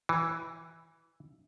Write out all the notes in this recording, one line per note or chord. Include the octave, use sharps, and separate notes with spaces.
E3